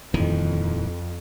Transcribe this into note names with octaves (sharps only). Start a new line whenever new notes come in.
D#1 F2 D#3 E3